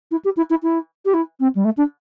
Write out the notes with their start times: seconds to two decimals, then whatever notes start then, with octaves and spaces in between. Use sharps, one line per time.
0.11 E4
0.24 G4
0.36 E4
0.50 E4
0.63 E4
1.05 G4
1.13 E4
1.40 C4
1.55 G3
1.64 A3
1.77 D4